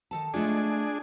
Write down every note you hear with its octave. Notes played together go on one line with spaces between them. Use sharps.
D#3 A4 A5
G#3 A3 D4 F4 G#4